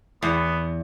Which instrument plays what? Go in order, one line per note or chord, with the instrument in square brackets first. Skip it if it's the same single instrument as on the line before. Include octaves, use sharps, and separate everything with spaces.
[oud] E2 [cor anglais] B3